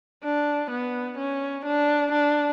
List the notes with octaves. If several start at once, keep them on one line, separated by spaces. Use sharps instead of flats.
D4
B3
C#4
D4
D4